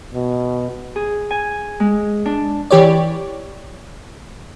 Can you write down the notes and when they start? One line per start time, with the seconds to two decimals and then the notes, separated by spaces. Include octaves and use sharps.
0.14 B2
0.96 G#4
1.31 G#5
1.80 G#3
2.26 D4
2.71 E3 G4 C#5 D5